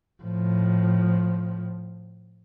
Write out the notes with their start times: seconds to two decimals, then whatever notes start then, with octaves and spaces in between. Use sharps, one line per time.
0.22 A2 F3